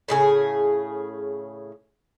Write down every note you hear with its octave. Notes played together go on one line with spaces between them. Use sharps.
A2 C#3 G#4